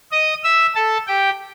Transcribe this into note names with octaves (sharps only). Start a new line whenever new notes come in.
D#5 D#6
E5 E6
A4 A5
G4 G5